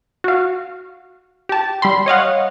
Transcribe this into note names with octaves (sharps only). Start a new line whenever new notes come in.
F#4 F5
G4 A5
G3 B5 C6
C#5 D#5 F5 F#5